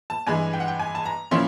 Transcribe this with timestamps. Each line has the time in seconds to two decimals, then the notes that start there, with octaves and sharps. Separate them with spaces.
0.10 A5
0.27 G2 E3 G#3 G#5
0.53 G5
0.60 F#5
0.68 G5
0.79 G#5
0.95 A5
1.05 A#5
1.31 A#2 F3 A#3 C#4 E4 C6